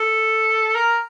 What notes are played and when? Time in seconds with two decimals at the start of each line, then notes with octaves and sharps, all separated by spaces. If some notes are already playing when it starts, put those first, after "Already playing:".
Already playing: A4
0.75 A#4